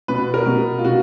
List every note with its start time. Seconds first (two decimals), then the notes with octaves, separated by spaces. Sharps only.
0.08 B2 B4
0.34 A#4
0.46 B2
0.79 F4
0.85 B2 F#4